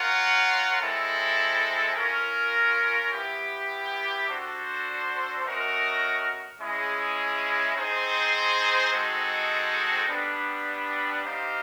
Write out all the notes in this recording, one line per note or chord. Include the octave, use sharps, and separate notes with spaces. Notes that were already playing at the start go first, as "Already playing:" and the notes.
Already playing: F4 A#4 C#5 F#5
G#3 C4 E4 A4
C#4 F4 A#4
B3 E4 G4
D4 F#4 A4 C5
A3 C#4 F#4 A#4 D#5
G#3 C#4 E4 G#4
C4 D#4 G#4 C5
G#3 C4 D#4 F#4 A4
G3 B3 D4
C4 D#4 G4 C5 F5